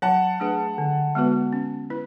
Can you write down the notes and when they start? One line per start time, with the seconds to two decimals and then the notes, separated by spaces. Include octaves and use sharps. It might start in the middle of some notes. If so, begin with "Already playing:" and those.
0.02 F#3 F#5 A5
0.40 A3 D4 G#4 B4
0.78 D3
1.15 G#3 B3 F#4 B4
1.53 C#4
1.90 E4 B4